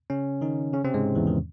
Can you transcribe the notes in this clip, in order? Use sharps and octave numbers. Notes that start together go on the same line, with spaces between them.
C#3 C#4
D#3 D#4
C#3 C#4
C3 C4
G#2 G#3
E2 E3
D#3